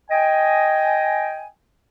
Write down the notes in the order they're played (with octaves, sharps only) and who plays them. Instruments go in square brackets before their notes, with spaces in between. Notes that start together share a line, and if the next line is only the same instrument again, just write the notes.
[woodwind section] D#5 G5 G#5